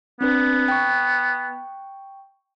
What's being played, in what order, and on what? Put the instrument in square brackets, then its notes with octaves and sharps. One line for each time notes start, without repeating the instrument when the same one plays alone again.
[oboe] B3 [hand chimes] C4 D4 B4
[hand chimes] G5 C#6